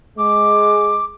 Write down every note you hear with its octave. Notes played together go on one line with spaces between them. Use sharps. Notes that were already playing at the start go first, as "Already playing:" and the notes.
G#3 D6